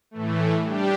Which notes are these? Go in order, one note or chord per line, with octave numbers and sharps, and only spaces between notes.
A2 E3 A3
G3 D4 G4